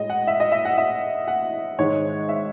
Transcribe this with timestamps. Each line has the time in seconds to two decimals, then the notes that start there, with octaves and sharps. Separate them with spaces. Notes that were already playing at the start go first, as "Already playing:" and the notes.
Already playing: A2 G#3 D#5
0.10 F#5
0.27 E5
0.40 D#5
0.52 E5
0.65 F#5
0.77 E5
1.28 F#5
1.78 G#2 D#3 G#3 C#5
2.29 E5